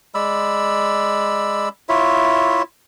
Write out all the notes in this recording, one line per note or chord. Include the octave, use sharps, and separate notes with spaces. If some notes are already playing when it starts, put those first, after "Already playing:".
G#3 D5 B5 E6
E4 F4 C#5 E5